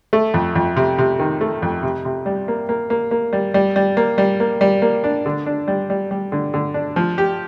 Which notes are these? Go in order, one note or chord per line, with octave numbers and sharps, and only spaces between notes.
A3
F2
F2
C3
C3
D#3
A3
F2
C3
C3
G3
A#3
A#3
A#3
A#3
G3
G3
G3
A#3
G3
A#3
G3
A#3
D4
D3
D4
G3
G3
G3
D3
D3
D4
F3
G4